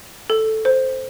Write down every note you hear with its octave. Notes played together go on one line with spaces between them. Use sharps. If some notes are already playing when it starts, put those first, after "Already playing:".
A4
C5